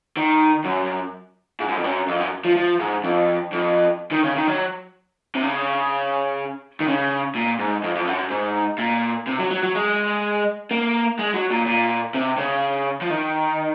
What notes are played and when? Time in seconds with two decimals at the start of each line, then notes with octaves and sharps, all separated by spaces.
0.17 D#3
0.64 F#2
1.60 G#2
1.68 F#2
1.77 F2
1.84 F#2
2.08 F2
2.20 F#2
2.45 F3
2.56 F3
2.79 G#2
3.04 F2
3.52 F2
4.12 D#3
4.24 C#3
4.36 D#3
4.48 F#3
5.35 C3
5.43 C#3
6.80 D#3
6.88 C#3
7.35 A#2
7.59 G#2
7.83 F2
7.95 F2
8.08 F#2
8.30 G#2
8.78 A#2
9.27 C3
9.39 F#3
9.51 F#3
9.63 F#3
9.75 G#3
10.71 A#3
11.19 G#3
11.34 F#3
11.50 A#2
11.66 A#2
12.14 C3
12.38 C#3
13.01 F3
13.10 D#3